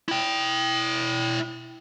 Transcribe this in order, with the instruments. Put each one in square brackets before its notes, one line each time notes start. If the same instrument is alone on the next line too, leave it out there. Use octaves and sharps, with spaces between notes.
[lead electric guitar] E4 G5